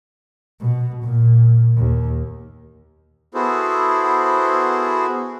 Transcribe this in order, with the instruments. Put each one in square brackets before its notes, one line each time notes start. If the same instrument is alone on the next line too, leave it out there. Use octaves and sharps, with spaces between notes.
[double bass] B2
A#2
D#2
[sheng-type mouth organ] B3 E4 F#4 G#4 A4 C5